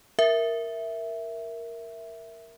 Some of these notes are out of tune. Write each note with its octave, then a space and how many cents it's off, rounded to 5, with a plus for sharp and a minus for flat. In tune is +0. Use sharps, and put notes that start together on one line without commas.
A#4 +0 E5 +0